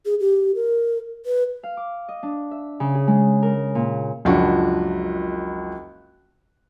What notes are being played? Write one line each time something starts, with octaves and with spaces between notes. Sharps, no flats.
G#4
G4
A#4
B4
F5
D6
D#5
D4
E5
C#3
G#4
G#3
A#4
A#2
F#1 C#2 F3 D4 F#4